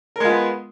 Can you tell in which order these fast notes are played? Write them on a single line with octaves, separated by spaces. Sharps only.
A#4 G#3 F4 B3